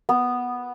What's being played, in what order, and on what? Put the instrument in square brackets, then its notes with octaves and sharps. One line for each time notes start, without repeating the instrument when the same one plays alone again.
[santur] B3